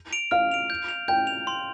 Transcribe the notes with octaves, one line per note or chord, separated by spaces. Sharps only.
D7 F7
F5 F6
D7 F7
G6
F7
G5 G6
F7
C6